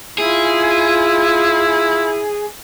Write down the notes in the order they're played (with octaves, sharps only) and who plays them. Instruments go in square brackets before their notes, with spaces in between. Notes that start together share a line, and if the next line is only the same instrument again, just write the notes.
[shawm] E4 [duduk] F4 [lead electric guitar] G#4